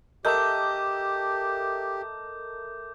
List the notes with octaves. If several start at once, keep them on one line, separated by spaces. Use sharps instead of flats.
A3 G4 A#4 D#5 D6 G6